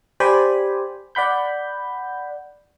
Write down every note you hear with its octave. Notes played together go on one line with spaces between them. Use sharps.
G4 C5 D5 G5 G#5 B5
D5 F#5 B5 G6